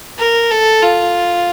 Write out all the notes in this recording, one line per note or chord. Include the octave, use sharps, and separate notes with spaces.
A#4
A4
F4